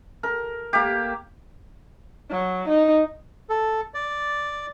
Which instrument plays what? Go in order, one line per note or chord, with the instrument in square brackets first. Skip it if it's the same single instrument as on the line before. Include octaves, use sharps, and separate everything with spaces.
[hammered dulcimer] A#4
A#3 G4
[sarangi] F#3
D#4
[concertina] A4
D5